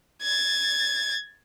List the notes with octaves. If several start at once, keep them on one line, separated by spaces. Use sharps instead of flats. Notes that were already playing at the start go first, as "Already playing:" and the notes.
G#6 A6